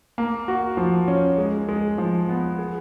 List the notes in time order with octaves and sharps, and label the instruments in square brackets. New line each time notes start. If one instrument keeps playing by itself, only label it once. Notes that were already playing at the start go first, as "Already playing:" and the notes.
[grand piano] A#3
F#4
F3
C#4
G#3
G#3
F3
B3
G#4